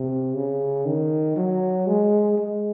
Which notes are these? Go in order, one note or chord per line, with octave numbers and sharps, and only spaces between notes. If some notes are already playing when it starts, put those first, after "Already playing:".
Already playing: C3
C#3
D#3
F#3
G#3
G#3